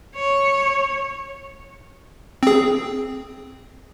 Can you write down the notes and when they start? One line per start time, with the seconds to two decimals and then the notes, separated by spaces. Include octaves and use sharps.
0.16 C#5
2.43 C4 G#4